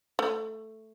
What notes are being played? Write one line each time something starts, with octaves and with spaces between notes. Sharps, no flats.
A3